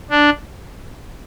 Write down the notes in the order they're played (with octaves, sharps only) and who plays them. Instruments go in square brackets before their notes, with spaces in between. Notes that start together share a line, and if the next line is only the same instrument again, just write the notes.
[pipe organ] D4